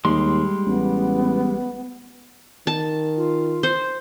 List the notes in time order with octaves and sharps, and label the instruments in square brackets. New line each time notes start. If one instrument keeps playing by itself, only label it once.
[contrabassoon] D#2 [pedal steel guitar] G3 G#3 C6
[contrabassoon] A1 [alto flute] B3
[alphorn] D#3 [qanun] A5
[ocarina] F4
[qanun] C5